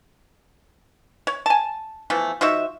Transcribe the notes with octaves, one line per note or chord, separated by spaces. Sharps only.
C#5
G#5 A5
E3 F3 A3 B3
F3 D#4 F#4 E5